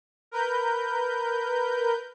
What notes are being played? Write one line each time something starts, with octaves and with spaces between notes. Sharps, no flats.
A#4 B4 G6